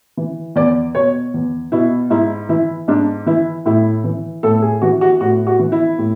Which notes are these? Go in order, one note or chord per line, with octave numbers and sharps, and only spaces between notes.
E3
E2 D5
B2 C#5
E2
B2 E4
G#2 E4
E3 E4
G#2 D4
E3 E4
A2 E4
E3
A2 A4
G#4
E3 F#4
F#4
A2 F#4
F#4
E3
E4
A2